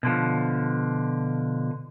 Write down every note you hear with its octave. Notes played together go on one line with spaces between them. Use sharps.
B2 D3 F3